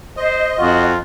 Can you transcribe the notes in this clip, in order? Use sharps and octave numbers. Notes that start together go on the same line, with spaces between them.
C5 D#5
F2 F4 F#4